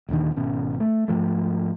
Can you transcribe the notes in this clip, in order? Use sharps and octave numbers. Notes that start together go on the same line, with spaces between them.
D#1 D#2 D3 D#3
G#1 B2 C#4
A3
G#2 F3 A3